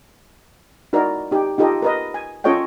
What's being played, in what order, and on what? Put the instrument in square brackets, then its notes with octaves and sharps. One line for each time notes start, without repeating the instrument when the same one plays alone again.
[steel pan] D#4 E4 F#4 A#4 D5
D#4 G4
D#4 F4 G4 A4 D#5 F5
A#4 B4 D#5
G#5
C#4 F4 A4 C#5 D#5 G5